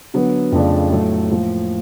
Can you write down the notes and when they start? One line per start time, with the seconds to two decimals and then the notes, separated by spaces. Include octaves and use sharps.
0.14 D3 F#3 B3
0.52 F2 C#3 F3 A3 D4
0.92 A2 F#3 A3
1.31 A2 F3 A#3